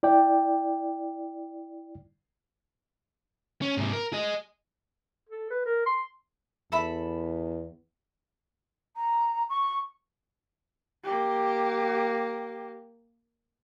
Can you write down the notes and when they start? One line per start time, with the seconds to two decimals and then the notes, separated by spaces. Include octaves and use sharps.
0.03 E4 D5 G5
3.62 C#4
3.77 G#2 C3
3.93 A#4
4.13 G#4 D#5
5.29 A4
5.50 B4
5.66 A#4
5.86 C6
6.72 E2 A4 E5 B5
8.96 A#5
9.50 C#6
11.04 A#3 G4